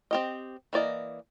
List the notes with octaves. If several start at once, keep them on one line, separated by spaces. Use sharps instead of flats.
C4 G4 D#5
E3 A#3 D5 D#5